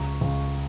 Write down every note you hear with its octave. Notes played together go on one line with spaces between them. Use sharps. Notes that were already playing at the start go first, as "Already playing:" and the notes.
Already playing: C#2 A#5 C#6
C#2